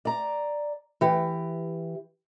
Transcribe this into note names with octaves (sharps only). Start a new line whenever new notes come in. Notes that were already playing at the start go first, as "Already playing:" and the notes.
D5 A#5
E3 G4